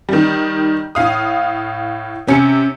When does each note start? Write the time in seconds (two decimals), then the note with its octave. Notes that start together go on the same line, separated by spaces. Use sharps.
0.09 D#3 G3
0.95 A2 F5 D#6
2.28 C3 C#4 C#7